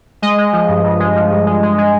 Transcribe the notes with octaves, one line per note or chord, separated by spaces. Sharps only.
G#3 D#5
G#3
F3
G2
G2
G#3
F3
G2
G#3
G#3
G#3